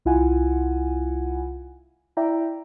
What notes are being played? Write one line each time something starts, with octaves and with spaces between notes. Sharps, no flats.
C2 E4 F4 F#5 G#5
E4 D5 E5 G5 A#5